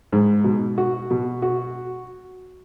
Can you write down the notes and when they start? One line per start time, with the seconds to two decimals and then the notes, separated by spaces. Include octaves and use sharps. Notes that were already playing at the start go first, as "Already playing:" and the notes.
0.12 G#2
0.44 B2
0.78 F#4
1.10 B2
1.42 F#4